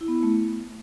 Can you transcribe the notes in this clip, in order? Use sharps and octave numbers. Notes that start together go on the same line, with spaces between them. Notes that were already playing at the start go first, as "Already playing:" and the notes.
E4
B3
E4
A3